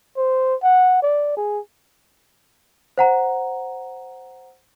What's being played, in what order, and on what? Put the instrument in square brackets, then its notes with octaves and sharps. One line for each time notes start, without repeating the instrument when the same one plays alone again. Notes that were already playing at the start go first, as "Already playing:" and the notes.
[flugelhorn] C5
F#5
D5
G#4
[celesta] C5 F#5 A#5